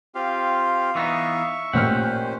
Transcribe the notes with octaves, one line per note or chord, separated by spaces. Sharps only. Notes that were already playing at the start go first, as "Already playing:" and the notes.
C4 F4 G4 F5
E3 B3 D#4 E5 C#6
A1 A#2 C#4 G4 C5 F#5 F6